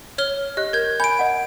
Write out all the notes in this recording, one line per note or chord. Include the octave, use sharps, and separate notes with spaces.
C#5 F6 G7
G4 D#5 F#6
A#4 G6 G#6
G#5 B5 G6 D7
D#5 F#5